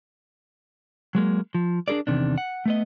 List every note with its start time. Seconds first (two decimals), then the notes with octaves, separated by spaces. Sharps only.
1.15 F#3 G#3 A#3
1.55 F3
1.88 D4 E4 G#4 A#4 D5
2.07 E2 C3 D#3 D4
2.38 F#5
2.66 A3 B3 D#5